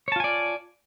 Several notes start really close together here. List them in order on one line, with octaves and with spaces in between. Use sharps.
C#5 A5 F4 G#5 D5